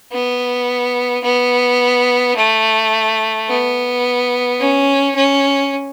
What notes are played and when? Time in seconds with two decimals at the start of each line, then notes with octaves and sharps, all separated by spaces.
0.12 B3
1.24 B3
2.37 A3
3.49 B3
4.60 C#4
5.16 C#4